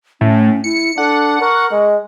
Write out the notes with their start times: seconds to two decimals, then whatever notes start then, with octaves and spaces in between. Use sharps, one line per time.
0.21 A2 C#4
0.64 E4 C#7
0.98 D4 A4 F#5
1.41 A#4 C#6
1.71 G#3 D#5